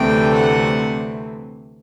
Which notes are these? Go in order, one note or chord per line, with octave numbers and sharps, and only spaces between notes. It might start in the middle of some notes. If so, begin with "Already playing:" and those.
Already playing: D2 C3 E3 A3 C4 G5
F#5